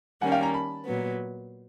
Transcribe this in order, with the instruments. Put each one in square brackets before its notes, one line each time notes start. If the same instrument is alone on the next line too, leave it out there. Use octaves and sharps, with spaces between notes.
[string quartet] D#3 G3 A#3 C#4 [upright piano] F#5 G#5
[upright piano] F5 G5
G#5 A#5
A5 B5
[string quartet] A#2 F#3 B3